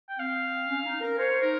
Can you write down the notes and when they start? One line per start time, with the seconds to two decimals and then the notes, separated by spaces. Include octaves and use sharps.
0.09 G5
0.19 C4 F5
0.68 C#4
0.85 D#4
1.01 A#4
1.18 C5 C#5
1.43 D#4 A#4